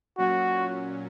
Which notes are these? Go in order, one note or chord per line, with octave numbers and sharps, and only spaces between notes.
A#2 F#3 C#4 F#4